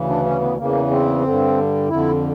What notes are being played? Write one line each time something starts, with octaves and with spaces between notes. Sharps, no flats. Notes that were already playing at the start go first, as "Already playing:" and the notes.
Already playing: D2 C#3 E3
D4
C#4
B3
E2 C#3 E3 A#3
C4
G2 D3
F2 D3 E4